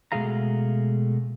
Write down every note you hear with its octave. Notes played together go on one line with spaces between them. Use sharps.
B2 G#3 A3 G#4 F5 A#5